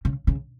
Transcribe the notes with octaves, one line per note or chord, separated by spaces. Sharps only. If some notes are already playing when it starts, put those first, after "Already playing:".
C#3
C#3